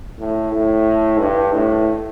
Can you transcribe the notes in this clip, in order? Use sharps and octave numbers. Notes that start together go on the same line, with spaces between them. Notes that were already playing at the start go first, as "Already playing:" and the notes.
A2
A2
G2
A2